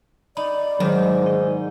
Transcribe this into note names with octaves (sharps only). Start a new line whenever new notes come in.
D#4 D5 B5
G#2 D#3 F#3
D#4